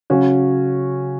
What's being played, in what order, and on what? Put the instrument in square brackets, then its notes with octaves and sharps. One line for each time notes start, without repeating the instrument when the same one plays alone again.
[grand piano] C#3 F#3 C#4 F#4